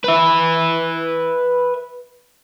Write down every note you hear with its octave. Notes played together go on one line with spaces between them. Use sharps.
B4 E5